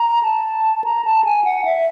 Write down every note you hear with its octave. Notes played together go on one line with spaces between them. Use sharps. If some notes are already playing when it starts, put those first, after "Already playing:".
Already playing: A#5
A5
A#5
A5
G#5
F#5
E5